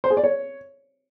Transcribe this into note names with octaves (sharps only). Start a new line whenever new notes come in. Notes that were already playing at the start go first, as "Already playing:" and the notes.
C5
G#4
D5
C#5